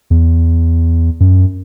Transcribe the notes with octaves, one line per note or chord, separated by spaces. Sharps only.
E2
F#2